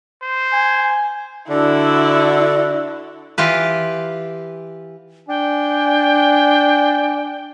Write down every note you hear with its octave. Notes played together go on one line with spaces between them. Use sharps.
C5
G#5
D3 D4 E4 F#4 A4
E3 F4 G4 B4
D4 G5 G#5